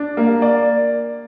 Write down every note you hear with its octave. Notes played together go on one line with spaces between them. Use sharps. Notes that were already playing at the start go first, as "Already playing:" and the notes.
Already playing: D4
A#3
D5